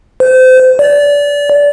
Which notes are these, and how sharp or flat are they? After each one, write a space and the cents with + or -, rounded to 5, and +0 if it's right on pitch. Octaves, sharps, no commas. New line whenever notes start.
C5 -30
D5 -25